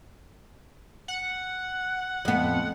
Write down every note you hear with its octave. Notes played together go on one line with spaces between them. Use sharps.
F#5
F2 B3